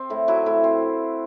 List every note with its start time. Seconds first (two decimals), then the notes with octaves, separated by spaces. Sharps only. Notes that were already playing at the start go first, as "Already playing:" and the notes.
Already playing: C4
0.10 A2 E4
0.28 F#3 E4
0.46 A2 E4
0.64 C4